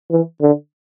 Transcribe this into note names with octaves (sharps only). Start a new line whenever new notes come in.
E3
D3